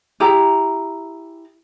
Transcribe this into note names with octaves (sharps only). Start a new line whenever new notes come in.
E4 G4 G#4 A#5